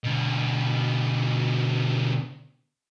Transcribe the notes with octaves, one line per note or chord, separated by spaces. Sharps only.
B2 D3